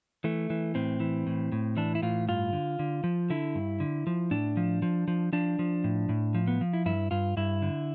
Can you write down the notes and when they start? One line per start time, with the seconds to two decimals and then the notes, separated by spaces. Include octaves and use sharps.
0.24 E3 A3
0.50 E3
0.75 A2 C4
1.00 E3
1.27 A2
1.52 A2
1.77 E3 D4
1.95 E4
2.02 A2 F4
2.28 G2 F4
2.53 D3
2.79 D3
3.04 F3
3.30 D3 E4
3.55 G2
3.80 D3
4.07 F3
4.31 A2 D4
4.57 F3
4.82 F3
5.08 F3
5.33 F3 D4
5.59 F3
5.84 A2
6.09 A2
6.35 F3
6.47 B3
6.61 F3
6.73 E4
6.86 G2 E4
7.11 G2 F4
7.37 G2 E4
7.62 D3